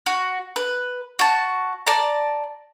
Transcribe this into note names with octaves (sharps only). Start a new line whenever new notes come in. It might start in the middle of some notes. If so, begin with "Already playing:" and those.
F#4
B4
F#4 A5
D5 A5 A#5